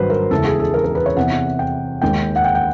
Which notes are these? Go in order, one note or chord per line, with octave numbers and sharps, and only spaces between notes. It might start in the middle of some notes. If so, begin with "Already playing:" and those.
Already playing: G#1 G2 D#3 F#3 B4 C5
A#4
E1 D2 C#3 E3 A4
G#4
A4
A#4
A#4
B4
C#5
E2 C3 E3 F#5
G5
D#2 D#3 G#3 G5
F#5
G5
G5